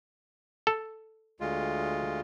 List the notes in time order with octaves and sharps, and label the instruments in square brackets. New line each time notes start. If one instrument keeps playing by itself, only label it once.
[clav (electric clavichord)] A4
[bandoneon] D2 G#3 F4